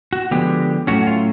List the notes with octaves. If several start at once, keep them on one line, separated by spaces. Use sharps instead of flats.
F#4
D3 F3 G#3 B3 G4
A2 F#3 A3 C#4 F#4
F4